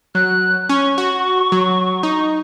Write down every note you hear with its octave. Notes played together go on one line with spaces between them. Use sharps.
F#3 F#6
C#4 C#6
F#4
F#3
D#4